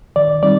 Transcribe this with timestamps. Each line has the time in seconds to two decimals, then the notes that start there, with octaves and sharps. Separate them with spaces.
0.16 D#3 D5
0.43 G3 C4 D#4 D5